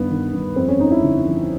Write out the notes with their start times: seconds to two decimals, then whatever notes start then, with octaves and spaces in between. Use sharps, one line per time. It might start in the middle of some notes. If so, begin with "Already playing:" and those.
Already playing: G2 D#3 B3
0.10 D#3
0.33 G2
0.56 F2 C4
0.68 C#4
0.79 F2 D#4
0.91 E4
1.03 D3
1.26 F3